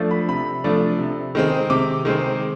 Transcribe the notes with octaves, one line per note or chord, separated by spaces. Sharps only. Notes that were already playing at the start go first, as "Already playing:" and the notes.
Already playing: F3 A3 D4
B5
C3 B5
F3 A3 D4
C3
D#3 G#3 C4
C3 D6
D#3 G#3 C4